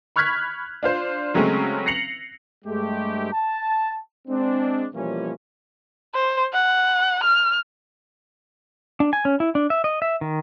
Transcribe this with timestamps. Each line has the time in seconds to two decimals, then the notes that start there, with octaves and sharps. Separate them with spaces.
0.16 B5 C#6 F6 F#6 G#6 B6
0.83 D4 F4 C5
1.34 C#3 F#3 G#3 A3 C4 C#4
1.86 A#6 C7 C#7 F7 F#7
2.65 G2 G#3 A3 G4
3.32 A5
4.28 G#3 C4 D4
4.94 B2 E3 F3 G3 A#3 C#4
6.15 C5
6.53 F#5
7.24 F6
9.00 D4
9.13 G#5
9.25 C#4
9.40 E4
9.55 D4
9.70 E5
9.84 D#5
10.02 E5
10.21 D#3